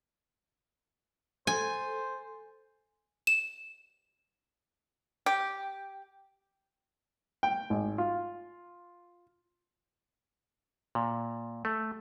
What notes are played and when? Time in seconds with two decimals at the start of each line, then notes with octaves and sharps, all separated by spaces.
1.47 A4 C5 G#5
3.27 E7
5.26 G4
7.43 G5
7.70 G#1
7.98 F4
10.95 A#2
11.65 A3